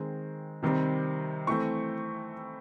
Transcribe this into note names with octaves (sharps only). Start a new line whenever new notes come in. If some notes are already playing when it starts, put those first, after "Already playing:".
Already playing: D#3 G#3 C4
C3 D#3 G3 C4
E3 A3 C4 C#6